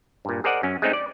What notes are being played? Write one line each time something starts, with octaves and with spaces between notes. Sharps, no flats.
G2 A#2
G#4 A#4 C5 D5 D#5 F#5
F#2 C#4
G#3 A3 C4 C#4 D#4
D5